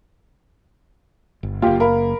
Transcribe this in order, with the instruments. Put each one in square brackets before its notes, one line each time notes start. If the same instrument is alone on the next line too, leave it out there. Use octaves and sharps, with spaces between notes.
[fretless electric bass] G1
[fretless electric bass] F#1 A#3 [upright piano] F4 G4
[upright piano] A#4 F5 B5